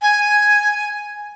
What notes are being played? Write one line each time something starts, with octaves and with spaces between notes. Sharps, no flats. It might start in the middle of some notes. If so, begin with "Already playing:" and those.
G#5